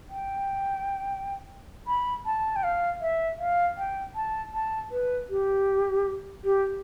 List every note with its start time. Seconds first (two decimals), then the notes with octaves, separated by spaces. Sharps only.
0.10 G5
1.87 B5
2.26 A5
2.56 G5
2.64 F5
3.02 E5
3.39 F5
3.78 G5
4.15 A5
4.54 A5
4.91 B4
5.30 G4
6.44 G4